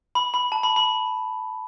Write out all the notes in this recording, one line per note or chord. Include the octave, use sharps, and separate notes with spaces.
B5
B5
A5
B5
B5